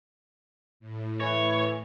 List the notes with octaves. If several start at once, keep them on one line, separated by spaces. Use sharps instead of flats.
A2
E3 C#5